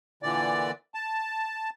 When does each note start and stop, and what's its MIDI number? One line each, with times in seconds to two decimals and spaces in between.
0.23 0.71 46
0.23 0.71 50
0.23 0.71 52
0.23 0.71 74
0.94 1.70 81